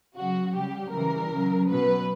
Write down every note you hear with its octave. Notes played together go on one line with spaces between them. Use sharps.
C#3 F#4
F#3
C#3 G3 G4
C#3 E3 G3 A#4
C#3 F#3
B2 F#3 B4